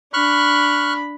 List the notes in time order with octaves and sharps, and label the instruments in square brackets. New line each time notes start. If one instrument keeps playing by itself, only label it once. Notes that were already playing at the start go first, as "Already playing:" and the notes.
[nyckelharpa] D4 B5 [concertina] C#6 F6 F#6